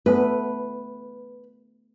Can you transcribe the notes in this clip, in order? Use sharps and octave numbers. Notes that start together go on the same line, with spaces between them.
A3 B3 B4